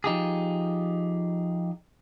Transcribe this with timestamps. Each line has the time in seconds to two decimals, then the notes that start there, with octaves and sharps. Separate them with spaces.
0.04 F3 D#4 G4 G#4